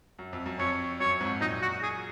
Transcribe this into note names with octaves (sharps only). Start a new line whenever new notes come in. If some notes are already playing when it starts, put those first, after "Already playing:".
F#2
F2
F#2
F2 C#5
F#2 C#5
F2 G#2
F#2 A#2 D#4
F#4
G#4